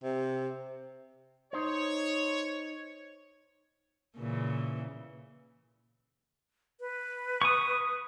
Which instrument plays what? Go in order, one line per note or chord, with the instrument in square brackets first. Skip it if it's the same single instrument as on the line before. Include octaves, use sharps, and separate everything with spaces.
[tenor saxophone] C3
[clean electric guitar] D#4 C5 [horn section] C#5
[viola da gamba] A#2 C#3 E3
[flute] B4
[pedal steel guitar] C#6 D#6